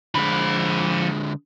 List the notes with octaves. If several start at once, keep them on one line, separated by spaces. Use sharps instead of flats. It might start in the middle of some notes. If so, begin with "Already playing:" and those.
D3 F3 G#3 B5